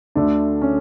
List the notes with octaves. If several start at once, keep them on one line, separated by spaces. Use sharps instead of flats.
D2 D3 A3 D4
C#4